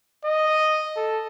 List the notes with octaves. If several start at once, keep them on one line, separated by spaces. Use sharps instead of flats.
D#5
A4